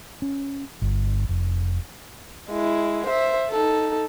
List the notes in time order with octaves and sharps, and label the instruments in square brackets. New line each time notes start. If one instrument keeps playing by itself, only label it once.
[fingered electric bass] C#4
G1
F1
[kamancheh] G#3 E4
C5 E5
D#4 A4